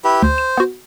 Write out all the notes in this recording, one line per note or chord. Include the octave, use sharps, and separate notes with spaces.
E4 G4 B4
D2 C5
E7
B3 F#4